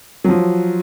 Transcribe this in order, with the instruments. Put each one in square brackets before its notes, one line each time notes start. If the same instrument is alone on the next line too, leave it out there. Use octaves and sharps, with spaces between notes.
[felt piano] F3 F#3